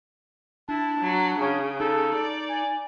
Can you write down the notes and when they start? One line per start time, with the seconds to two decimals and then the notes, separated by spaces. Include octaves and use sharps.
0.69 D4 E4 A5
1.01 F#3
1.39 C#3 C#4
1.80 D#4 A4
2.14 D5
2.49 G#5